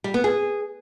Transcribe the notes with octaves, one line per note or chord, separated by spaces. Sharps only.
G3
B3
G#4